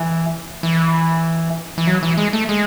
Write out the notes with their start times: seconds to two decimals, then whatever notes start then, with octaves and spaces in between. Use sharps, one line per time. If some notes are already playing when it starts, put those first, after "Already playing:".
Already playing: E3
0.63 E3
1.78 E3
1.87 F#3
2.03 E3
2.17 G#3
2.33 A3
2.49 G#3